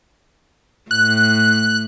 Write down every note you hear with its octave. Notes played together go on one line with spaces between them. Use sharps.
A2 F#6